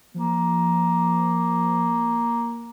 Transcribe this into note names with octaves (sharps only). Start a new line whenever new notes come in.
F3 A#3